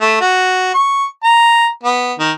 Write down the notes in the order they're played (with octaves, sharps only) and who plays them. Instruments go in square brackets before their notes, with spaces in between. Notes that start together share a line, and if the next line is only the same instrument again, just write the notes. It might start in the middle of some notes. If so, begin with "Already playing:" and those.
[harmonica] A3
F#4
C#6
A#5
B3
D#3